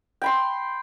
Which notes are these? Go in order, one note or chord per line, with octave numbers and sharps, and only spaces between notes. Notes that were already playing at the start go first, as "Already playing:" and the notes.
G5 B5 C6